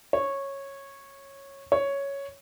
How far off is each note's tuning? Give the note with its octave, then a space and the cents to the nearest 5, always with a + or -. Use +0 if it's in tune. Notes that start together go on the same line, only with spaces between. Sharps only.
C#5 -10
C#5 +5